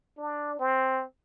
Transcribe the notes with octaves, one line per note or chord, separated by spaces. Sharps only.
D4
C4